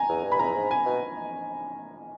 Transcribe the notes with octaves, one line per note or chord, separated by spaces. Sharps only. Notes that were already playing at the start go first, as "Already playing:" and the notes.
Already playing: G#5 A#5
E2
G2
B5
E2 A#5
G#2
G#5
B2